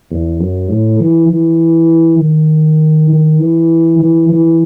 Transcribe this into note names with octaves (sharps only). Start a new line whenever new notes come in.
E2
F#2
A2
E3
E3
D#3
D#3
E3
E3
E3